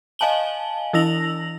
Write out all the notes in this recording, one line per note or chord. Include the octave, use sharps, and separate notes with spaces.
D#5 F5 G#5 A5 F#7 G7
E3 E4 E6 A#6 F7 F#7